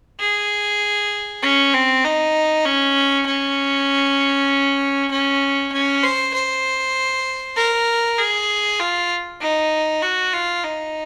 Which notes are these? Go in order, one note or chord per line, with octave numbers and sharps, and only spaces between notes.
G#4
C#4
C4
D#4
C#4
C#4
C#4
C#4
C5
C5
A#4
G#4
F4
D#4
F#4
F4
D#4